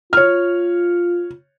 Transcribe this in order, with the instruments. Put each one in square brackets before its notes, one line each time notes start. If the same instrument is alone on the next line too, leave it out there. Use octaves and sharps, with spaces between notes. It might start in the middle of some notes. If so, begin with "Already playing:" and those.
[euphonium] F4 [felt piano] C#5 F6